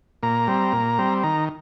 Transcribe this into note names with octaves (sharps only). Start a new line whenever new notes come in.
A#2 A#5
G3 C4
A#2
G3 C4
D#3 A#5